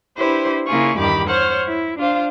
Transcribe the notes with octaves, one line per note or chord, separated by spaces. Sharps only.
D4 E4 G4 B4 C5
C#3 A#3 E4 F4 G#4 C#6
E2 G2 D#3 G4 B5 D6
C5 C#5 F#5 F6
E4
D4 F4 C5 F5